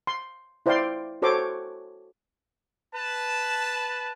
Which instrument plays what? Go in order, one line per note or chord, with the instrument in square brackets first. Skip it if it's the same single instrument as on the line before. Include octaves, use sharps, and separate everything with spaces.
[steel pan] C6
E4 C5 D5 F5 G5 C6
F#4 A4 C5 C#5 C6 D6
[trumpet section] B4 A5